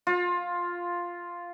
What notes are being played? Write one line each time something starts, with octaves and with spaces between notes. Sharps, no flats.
F4